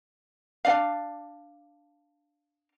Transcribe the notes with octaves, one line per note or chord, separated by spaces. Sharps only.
D4 D5 F5